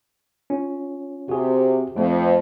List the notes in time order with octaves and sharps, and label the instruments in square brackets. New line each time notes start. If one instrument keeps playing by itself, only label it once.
[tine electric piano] C#4 F4
[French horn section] C3 [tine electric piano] F#4 G#4
[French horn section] F2 [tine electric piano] A3 F4